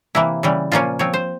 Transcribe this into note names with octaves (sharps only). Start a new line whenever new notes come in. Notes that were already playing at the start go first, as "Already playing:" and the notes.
C3 E3 A#3 E4
C#3 E3 G3
A#2 F3 A#3 C#4 F4
F3 C4 C#5
C5